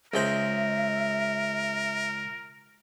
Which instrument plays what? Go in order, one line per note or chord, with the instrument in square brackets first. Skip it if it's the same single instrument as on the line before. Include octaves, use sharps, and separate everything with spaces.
[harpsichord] C#2 G#3 C5 [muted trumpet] A#4 [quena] E5